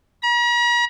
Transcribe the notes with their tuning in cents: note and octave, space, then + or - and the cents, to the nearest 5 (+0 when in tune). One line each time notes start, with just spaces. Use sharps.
A#5 +45